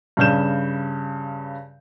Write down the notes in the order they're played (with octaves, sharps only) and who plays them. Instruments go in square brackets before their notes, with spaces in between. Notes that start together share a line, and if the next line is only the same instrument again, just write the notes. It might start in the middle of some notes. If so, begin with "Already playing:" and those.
[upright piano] G2 C#3 F6 G6 E7